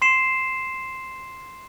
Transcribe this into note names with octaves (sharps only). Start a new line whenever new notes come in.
C6 C7 E7